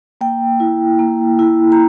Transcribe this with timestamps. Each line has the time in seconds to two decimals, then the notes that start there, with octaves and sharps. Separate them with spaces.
0.21 A#3 G5
0.60 E4
0.99 A#3
1.39 E4
1.72 A#5